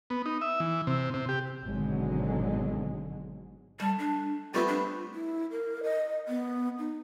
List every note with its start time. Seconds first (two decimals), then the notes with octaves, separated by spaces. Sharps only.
0.10 B3
0.26 D#4
0.41 E5
0.60 E3
0.87 C3
1.14 C3
1.29 G4
1.63 G#1 B2 D3 F#3 G#3
3.80 G3 A3
3.99 D4
4.54 G3 A3 B3 C4 F4 B4
4.68 D4
5.14 E4
5.51 A#4
5.83 D#5
6.28 B3
6.79 D#4